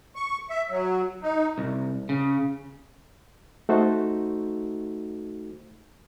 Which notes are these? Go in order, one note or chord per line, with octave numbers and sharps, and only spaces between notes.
C#6
E5
F#3
D#4
C2
C#3
A3 D#4 F#4 A4 C5